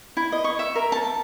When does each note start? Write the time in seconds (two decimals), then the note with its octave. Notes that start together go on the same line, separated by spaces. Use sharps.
0.17 E4
0.32 D#5
0.44 C#6
0.59 E5
0.76 A#4
0.92 A5